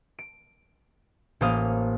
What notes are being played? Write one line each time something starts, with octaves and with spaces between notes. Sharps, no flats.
D7
A1 A#3 C5 F5 D#6